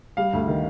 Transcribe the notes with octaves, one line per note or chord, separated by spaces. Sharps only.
G3 F5
D2
D#3